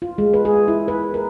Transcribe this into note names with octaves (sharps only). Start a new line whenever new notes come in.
F4
G#3
B4
G#4
E4
B4
A#4